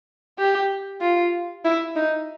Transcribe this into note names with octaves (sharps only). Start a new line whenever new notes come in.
G4
F4
E4
D#4